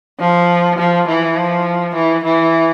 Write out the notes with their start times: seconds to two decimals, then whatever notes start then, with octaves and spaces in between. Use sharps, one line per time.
0.20 F3
0.78 F3
1.08 E3
1.37 F3
1.95 E3
2.24 E3